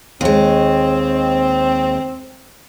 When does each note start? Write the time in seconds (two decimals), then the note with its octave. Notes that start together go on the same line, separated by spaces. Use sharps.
0.21 D#2 G#3 C4